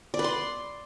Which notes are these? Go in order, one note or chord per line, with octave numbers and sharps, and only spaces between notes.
D5
B4
C6